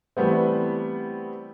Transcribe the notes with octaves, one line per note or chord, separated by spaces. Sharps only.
E3 G3 A3 B3 C4